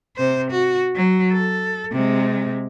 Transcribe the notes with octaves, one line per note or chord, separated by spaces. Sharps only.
C3 C5
F#4
F#3
A4
C3 G#3